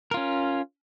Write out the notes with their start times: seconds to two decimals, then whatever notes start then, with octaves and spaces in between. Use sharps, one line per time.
0.11 A#4
0.14 F4
0.17 C#4